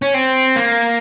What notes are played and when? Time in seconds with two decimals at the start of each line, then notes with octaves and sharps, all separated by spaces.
0.02 C#4
0.14 C4
0.56 A#3